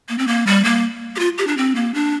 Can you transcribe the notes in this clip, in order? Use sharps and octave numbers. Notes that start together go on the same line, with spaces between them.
A#3
C4
A#3
G3
A#3
G4
F4
G4
D4
C4
A#3
D4